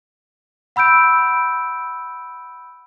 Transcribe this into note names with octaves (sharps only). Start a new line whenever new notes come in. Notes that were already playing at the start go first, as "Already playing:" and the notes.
F#5 B5 E6 G6 D7